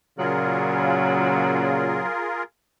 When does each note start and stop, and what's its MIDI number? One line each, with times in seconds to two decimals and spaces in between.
0.19 2.01 46
0.19 2.01 49
0.19 2.06 54
0.19 2.43 65
0.19 2.43 68
0.19 2.43 70